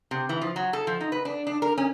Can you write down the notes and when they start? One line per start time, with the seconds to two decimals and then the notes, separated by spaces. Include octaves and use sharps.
0.11 C3
0.29 E3
0.41 F3
0.56 F#3
0.73 A4
0.87 F3
1.01 D#4
1.12 B4
1.25 D4
1.47 D4
1.62 A#4
1.78 C#4